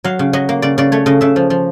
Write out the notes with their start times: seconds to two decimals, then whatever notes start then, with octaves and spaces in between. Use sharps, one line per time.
0.04 F#3 F5
0.19 C#3
0.33 F#3 D#5
0.49 A#3
0.62 C#3 D5
0.78 C#3 D5
0.92 A3 C#5
1.06 C#3 D#5
1.21 C#3 E5
1.36 F3
1.50 F3